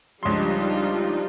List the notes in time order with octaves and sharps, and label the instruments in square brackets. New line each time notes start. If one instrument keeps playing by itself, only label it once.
[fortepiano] C#2 C6 [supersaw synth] F3 D4 D#4 [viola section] G3 F4